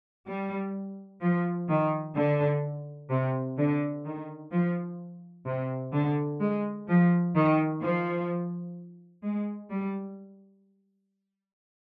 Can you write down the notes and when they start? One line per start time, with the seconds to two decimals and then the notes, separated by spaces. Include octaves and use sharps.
0.27 G3
1.22 F3
1.69 D#3
2.16 D3
3.10 C3
3.58 D3
4.05 D#3
4.52 F3
5.45 C3
5.93 D3
6.40 G#3
6.88 F3
7.35 D#3
7.82 F3
9.23 G#3
9.71 G3